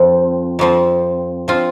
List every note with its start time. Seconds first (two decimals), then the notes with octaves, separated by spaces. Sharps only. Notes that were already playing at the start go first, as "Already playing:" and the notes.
Already playing: F2 F3 C4
0.59 F2 F3 C4
1.48 F3 C4 F4